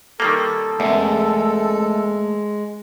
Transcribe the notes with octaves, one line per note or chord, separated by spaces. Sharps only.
D#3 G3 A#3 A4
E2 G#3 A3 G#4 A#4